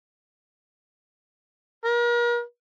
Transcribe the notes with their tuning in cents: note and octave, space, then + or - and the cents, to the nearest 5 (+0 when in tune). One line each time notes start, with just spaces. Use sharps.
A#4 +40